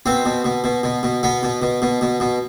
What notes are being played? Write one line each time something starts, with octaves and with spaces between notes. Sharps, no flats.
B2 C4
B2
B2
B2
B2
B2
B2 B3
B2
B2
B2
B2
B2